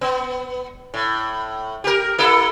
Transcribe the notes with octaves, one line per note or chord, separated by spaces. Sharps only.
B3
A2
G4 A#4
A#3 E4 A4